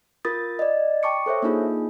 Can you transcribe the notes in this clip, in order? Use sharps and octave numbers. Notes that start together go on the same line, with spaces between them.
F4 A#4 D#6 A6
D5 D#5
G5 A5 C#6 D6 C#7
A4 C5 C#5 E5
A#3 D4 D#4 F4 G#4